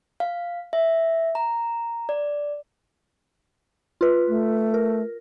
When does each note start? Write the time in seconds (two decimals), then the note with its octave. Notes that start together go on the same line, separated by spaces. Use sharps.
0.20 F5
0.73 E5
1.35 A#5
2.09 D5
4.01 F4 B4
4.28 A3
4.74 A#4